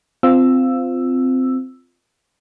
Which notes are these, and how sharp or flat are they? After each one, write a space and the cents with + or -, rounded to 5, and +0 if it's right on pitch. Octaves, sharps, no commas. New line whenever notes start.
C4 -15 F4 +0 E6 +5